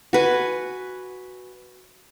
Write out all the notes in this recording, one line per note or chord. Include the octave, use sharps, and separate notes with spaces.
F#4 B4 G#5